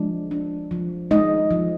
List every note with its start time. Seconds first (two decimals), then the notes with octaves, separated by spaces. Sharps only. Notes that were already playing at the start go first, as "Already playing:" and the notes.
Already playing: F3 G#3 D4
0.31 D4
0.71 F3
1.11 G#3 D#4 D#5
1.51 F3